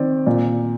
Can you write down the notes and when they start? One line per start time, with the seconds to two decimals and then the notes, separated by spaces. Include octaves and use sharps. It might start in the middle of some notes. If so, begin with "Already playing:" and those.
Already playing: D#3 C4 D5
0.26 A#2 D5